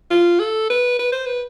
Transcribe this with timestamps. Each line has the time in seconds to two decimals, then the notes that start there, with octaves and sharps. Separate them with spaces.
0.10 F4
0.39 A4
0.70 B4
0.99 B4
1.12 C5
1.26 B4